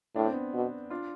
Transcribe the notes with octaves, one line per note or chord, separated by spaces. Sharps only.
A2 D4
C4
B3 D4
B2
D4 F4